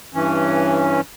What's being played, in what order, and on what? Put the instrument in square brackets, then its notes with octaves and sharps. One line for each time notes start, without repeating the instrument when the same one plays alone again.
[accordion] G2 E3 C#4